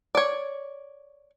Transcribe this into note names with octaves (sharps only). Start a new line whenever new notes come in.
C#5 D5